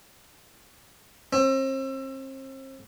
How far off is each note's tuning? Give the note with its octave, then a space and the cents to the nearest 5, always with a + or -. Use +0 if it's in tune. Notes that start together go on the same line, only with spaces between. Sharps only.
C4 +40